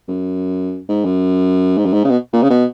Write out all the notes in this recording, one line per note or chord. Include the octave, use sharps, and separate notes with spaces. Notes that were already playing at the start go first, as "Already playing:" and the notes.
F#2
G#2
F#2
G#2
F#2
G#2
C#3
B2
A#2
C#3
B2